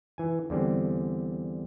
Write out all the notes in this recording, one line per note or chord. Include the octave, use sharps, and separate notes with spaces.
E3 G#5
E2 D3 G3 C4